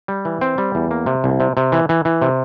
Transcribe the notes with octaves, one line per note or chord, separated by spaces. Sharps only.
G3
E3
C4
G3
E2
A#3
C3
C2
C3
C3
E3
E3
E3
C3